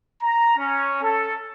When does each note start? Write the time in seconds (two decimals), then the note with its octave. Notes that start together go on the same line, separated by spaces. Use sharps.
0.23 A#5
0.57 C#4
1.03 A4